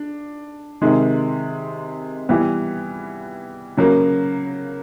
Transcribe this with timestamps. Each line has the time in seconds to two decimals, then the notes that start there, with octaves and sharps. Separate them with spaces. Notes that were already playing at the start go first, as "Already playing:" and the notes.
Already playing: D4
0.81 C3 D#3 G#3
2.29 E3 G3 B3 E4
3.77 C#3 F#3 A#3